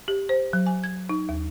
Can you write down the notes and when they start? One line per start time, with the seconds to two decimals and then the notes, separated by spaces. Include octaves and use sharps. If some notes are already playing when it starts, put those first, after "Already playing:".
0.08 G4
0.29 C5
0.53 F#3
0.66 G#5
0.84 G#6
1.09 D#4
1.29 D#2